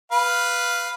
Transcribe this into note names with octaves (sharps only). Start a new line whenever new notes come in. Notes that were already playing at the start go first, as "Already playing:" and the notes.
B4 F5